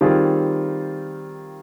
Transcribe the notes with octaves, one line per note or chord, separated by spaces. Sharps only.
D#3 G3 C4 F4 G#4